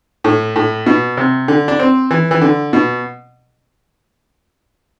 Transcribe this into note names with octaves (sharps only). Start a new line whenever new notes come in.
A2
A2
B2
C3
D3
D4
C4
E3
E3
D3
B2